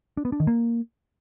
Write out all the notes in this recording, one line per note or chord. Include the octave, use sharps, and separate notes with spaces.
D4
B3
D4
D#3
A#3